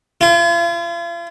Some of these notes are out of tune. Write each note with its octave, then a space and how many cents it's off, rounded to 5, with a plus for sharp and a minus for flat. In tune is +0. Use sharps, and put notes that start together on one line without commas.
F4 -40